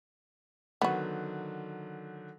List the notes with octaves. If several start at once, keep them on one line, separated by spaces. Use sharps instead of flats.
D3 D#3 F#3 B3 F#4